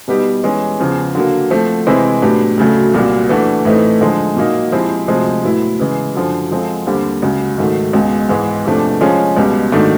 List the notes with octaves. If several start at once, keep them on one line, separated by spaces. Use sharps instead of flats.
B2 G3 B3 D#4 G4
E3 G#3 C#4
E2 C#3 F3
D3 F#3 A#3
F3 A3 C4
C3 E3 G#3 C4 E4
A2 F#3 B3 D4 G4
D2 C#3 F#3 A3
C2 A#2 F#3 A#3
E3 A3 D4 F#4
A2 E3 A3 C4 D#4
D3 F3 G#3
A#2 F#3 A#3 D#4
F3 G#3 C4 E4 G4
D2 C3 F3 G#3
A2 F#3 B3 E4
C#3 E3 G#3
F#2 D3 F3
F3 G#3 C4 F4 A4
D#2 D3 G3 C4
C#2 C#3 F#3
G#2 D#3 F#3 A3
C#2 B2 G#3
G#2 E3 G#3 B3
E2 C3 F3 A3 D4
F3 G#3 C#4 F4 G#4
C#2 B2 G3
G#2 D#3 F#3 A3 D4